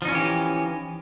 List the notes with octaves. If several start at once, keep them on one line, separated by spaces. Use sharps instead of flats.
E3 F3 C#4 D#4 G4